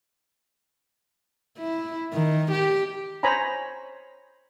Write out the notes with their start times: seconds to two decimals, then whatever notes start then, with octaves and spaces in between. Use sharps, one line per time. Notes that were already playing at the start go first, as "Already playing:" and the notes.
1.58 E4
2.14 D#3
2.52 G4
3.23 C5 C#5 G#5 A#5 B5